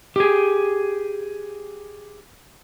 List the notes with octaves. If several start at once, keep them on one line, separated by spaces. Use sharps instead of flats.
G4 G#4